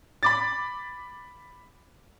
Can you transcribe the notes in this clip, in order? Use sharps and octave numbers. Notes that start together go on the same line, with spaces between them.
B5 D6 A6